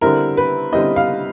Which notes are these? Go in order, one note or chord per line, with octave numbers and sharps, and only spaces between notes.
D3 G3 C4 E4 A#4
B4
D3 G3 C4 E4 D#5
F5